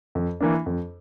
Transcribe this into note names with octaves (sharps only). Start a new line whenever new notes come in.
F2
E3 A#3 D4
F2